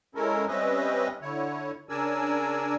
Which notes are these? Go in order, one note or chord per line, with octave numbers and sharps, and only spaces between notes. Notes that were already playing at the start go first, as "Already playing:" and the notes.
G#3 C#4 E4 A4 A#4
G3 C4 C#4 B4 D#5 E5
D3 E4 C#5
C#3 D4 A#4 D5 G#5 E6